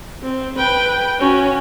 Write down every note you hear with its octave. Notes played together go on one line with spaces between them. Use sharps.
C4
B4 G5
C#4 F#4